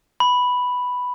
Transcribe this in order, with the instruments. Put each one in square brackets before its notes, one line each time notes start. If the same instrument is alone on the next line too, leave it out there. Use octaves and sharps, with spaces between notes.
[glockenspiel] B5